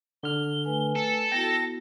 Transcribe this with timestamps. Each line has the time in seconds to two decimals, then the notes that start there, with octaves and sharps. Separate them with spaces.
0.23 D3 F6 G7
0.65 A3 B4 G#5
0.95 A4
1.32 B3 E4 F#4 G5 A5 A#6